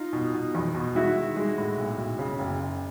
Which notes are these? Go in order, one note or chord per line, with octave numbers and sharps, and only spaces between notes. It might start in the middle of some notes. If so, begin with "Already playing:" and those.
Already playing: D#4 F4
B2
B2
E2
B2
G#3 E4 F#4
D#3
G#3
A2
B1
B1
C#3
F#1
F#1